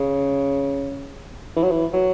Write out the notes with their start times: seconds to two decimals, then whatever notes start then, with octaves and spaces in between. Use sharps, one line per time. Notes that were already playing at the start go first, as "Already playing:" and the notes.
Already playing: C#3
1.56 E3
1.63 F#3
1.71 E3
1.93 F#3